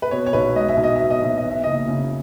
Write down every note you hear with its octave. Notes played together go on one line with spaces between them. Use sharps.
B4
B2 C#5
C#5
B1 B4
G#3 D#5
E5
B1
D#5
B2 E5
D#5
B1 E5
D#5
E2
E5
F#1 D#5
C#3